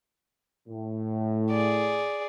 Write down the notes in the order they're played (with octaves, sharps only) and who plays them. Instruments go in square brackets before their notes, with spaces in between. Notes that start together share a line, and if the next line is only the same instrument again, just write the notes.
[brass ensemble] A2
[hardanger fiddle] G#4 D5